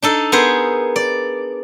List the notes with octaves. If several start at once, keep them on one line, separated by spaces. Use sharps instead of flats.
D4 D#4 A4
B3 G#4 A#4 C5
D5